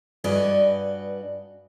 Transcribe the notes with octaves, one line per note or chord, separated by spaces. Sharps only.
G2 F#4 B4 D5 D#5 G#5